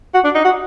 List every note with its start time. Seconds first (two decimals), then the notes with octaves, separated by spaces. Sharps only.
0.14 F#4
0.24 D4
0.35 D#4
0.45 F#4